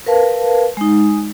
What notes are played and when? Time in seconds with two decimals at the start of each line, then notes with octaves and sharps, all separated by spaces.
0.06 A#4 B4 F5 A5
0.77 G#3 D#4